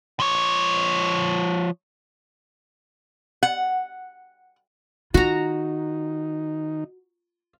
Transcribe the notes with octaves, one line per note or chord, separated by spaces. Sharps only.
F3 C#5
F#5
D#3 D#4 F4 F#4 A#5